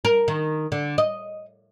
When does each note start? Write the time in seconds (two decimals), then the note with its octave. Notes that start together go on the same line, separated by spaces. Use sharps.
0.05 A#4
0.28 D#3
0.72 D3
0.98 D#5